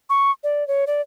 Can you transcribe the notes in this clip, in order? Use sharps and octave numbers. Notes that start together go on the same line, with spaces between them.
C#6
D5
C#5
D5